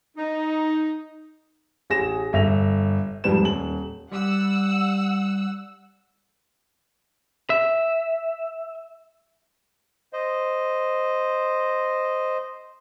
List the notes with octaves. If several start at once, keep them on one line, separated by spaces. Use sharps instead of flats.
D#4
A1 G#4 A#6 E7
G1 E5 A#6 F7
F2 G#2 G3 B4 E7
D#1 F#7
G3 F#5 E6
E5
C5 D#5